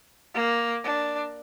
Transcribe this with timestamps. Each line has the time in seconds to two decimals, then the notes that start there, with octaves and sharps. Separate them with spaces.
0.35 A#3
0.83 D4